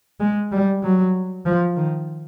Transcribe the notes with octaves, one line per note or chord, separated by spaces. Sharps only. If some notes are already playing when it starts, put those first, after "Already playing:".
G#3
G3
F#3
F3
D#3